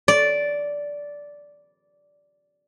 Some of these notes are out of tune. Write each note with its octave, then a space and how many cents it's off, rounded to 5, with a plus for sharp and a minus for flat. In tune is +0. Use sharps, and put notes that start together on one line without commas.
D5 -10